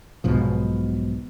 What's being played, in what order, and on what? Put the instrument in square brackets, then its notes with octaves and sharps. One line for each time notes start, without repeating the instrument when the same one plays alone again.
[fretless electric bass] B1 G#2 B2 F3